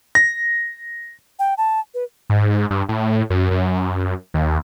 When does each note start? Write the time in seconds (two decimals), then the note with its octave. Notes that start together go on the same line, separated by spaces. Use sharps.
0.15 A#6
1.39 G5
1.58 A5
1.94 B4
2.30 G#2
2.70 G2
2.89 A2
3.30 F#2
3.51 F#2
4.34 D#2